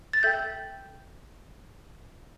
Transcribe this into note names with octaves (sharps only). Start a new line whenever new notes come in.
A6
A4 E5 G5 G6